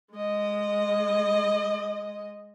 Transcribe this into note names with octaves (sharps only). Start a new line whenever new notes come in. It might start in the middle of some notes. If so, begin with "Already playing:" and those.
G#3 D#5